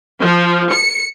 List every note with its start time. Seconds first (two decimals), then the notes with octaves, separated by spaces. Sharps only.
0.22 F3
0.73 C#7